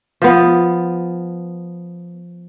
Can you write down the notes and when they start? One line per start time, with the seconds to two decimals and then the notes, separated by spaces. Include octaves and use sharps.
0.22 F3 B3